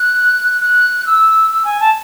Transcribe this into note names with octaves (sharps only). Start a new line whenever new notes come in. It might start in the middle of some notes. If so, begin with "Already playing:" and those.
Already playing: F#6
F#6
E6
E6
G#5
A5